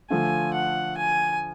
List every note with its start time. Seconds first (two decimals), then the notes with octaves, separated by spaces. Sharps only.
0.10 D3 F3 A3 F4 G#5
0.54 F#5
0.97 G#5